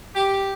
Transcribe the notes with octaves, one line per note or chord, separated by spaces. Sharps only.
G4